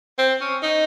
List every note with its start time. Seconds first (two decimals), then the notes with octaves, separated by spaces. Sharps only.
0.19 C4
0.41 C#4
0.63 D#4